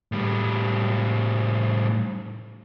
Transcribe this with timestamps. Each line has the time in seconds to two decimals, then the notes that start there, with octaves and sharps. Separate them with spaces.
0.12 A2 G3